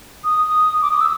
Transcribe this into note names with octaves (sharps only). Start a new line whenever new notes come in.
D#6
D6
D#6
E6